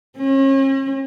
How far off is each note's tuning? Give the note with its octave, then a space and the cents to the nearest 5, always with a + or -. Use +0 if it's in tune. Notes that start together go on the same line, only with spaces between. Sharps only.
C#4 -40